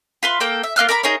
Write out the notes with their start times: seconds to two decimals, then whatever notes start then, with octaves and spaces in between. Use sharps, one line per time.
0.23 F4 B4 C6
0.40 A#3 A4 G5 G6
0.63 E5
0.76 A#3 F4 F6 F#6
0.89 A#4 D5 A#5 B5
1.03 D#4 G#4 A#4 C#5